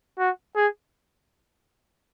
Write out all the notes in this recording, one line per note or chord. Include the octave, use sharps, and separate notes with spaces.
F#4
G#4